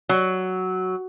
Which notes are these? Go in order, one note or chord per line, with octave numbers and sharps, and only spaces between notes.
F#3